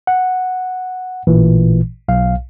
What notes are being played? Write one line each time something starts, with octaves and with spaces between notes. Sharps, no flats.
F#5
A1 A#2 E3
B1 F5